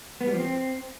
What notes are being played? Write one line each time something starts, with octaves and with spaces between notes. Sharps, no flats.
B3
G3
F3
C4